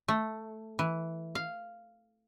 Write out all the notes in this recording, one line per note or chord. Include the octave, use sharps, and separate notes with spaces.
A3
E3
F5